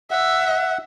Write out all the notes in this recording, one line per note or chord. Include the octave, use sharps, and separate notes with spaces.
E5 F#5